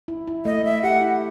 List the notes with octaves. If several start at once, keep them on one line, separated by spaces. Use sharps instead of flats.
E4
E4
A3 D#5
A3 E5
G4 F#5
E4